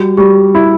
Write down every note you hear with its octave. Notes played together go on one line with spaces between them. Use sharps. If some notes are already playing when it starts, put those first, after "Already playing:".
Already playing: G3 F#4
G3 G4
E4